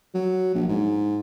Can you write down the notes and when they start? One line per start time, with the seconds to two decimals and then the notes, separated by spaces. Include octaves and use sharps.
0.14 F#3
0.55 A#1
0.68 G#2